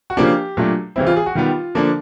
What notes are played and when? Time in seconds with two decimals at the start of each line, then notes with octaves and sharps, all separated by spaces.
0.10 F#4
0.17 C#3 F3 A#3 D4 G4
0.57 A#2 F#3 A3 D4
0.96 C#3 E3 G3 C4 E4
1.07 F4
1.16 G#4
1.26 F#4
1.35 D#3 G3 B3 F4
1.75 D3 F3 A#3 D4